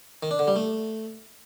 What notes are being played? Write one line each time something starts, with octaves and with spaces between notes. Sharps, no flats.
D#3
D4
D3
G3
A3